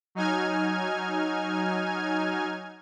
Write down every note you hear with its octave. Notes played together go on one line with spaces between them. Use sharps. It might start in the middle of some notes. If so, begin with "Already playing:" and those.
F#3 D#4 G#5 F6 G#6